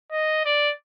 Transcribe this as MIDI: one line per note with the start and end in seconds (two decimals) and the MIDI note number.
0.12 0.43 75
0.45 0.71 74